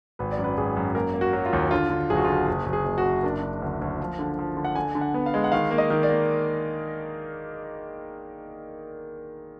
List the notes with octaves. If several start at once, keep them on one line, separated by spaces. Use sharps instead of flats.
G#1 B4
D5
F#2
B4
G#1 G#4
F#2
A#3 A#4
A#3
F#4
F#3
F4
D#2
D3 F4
D3
F#1 G#4
F#4
F4
D3 F#4
F#1 G#4
F#1
G#4
F#1
F#4
F#1
D4 A#4
D4
D2
D2
F3
D3
F3
D3
F#5
D3 G#5
D3
F#5
B3
F5
G#3
F#5
D#3 F5
A#3
D#5
D#3
D5
A#3